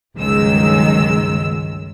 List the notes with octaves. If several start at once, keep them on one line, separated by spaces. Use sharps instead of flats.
G1 C#2 D#3 F#3 G#3 E6